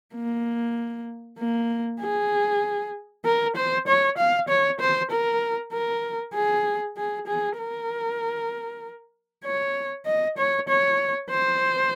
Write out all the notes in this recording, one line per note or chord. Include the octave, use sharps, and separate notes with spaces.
A#3
A#3
G#4
A#4
C5
C#5
F5
C#5
C5
A#4
A#4
G#4
G#4
G#4
A#4
C#5
D#5
C#5
C#5
C5